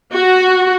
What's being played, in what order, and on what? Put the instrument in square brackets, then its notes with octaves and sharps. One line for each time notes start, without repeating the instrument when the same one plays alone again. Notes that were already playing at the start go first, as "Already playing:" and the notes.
[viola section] F#4